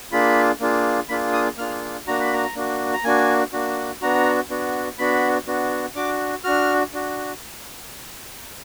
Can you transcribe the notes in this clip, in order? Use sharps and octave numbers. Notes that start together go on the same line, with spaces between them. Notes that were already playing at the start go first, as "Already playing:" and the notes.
A#3 D4 F4 G#4 B5
A#3 D4 F4 G#4
A#3 D4 F4 G#4 B5
D#6
A#3 D4 F4 G#4 F6
A#3 D4 F#4 A#5
B5
A#5
A#3 D4 F#4
A#5
A#3 D4 F#4 G#5
A#3 D4 F#4
B3 D4 F#4 A#5
B3 D4 F#4
B3 D4 F#4 B5
B3 D4 F#4
D4 F#4 D6
D4 F#4 F6
D4 F#4